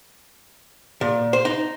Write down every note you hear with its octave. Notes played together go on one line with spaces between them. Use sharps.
A#2
C5
D#4